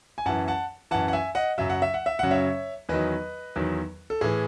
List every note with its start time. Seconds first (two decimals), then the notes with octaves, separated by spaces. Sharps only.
0.18 G#5
0.26 F#2 E3 F#5 A5
0.48 F#5 A5
0.91 F#2 E3 F#5 A5
1.08 F#5
1.13 E5 G#5
1.35 D#5 F#5
1.58 F#2 C#3 F#3 E5
1.70 F#5
1.82 E5
1.94 F#5
2.06 E5
2.19 F#2 C#3 F#3 F#5
2.31 C#5 E5
2.89 E2 D#3 F#3 B4 D#5
3.56 E2 D#3 F#3
4.10 A4
4.21 A2 E3 G#4